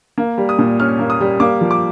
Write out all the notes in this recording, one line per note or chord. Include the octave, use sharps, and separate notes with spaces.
A#3
G3
D#6
A#2
C#4 F6
A#3
D#6
G3
A#3 D6
F3
D6